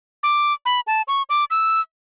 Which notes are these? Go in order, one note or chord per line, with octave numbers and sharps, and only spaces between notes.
D6
B5
A5
C#6
D6
E6